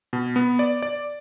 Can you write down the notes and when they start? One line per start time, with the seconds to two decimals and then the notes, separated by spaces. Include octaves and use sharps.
0.13 B2
0.36 B3
0.59 D5
0.82 D5